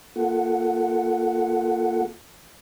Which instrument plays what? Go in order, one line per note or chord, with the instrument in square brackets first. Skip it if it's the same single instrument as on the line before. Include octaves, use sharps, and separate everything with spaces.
[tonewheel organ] A#3 F4 A4 F#5